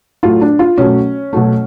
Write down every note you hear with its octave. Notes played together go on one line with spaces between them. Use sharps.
A2 F#3 A3 F4
D4
F4
B2 F#3 A3 C#4
B2 F#3 A3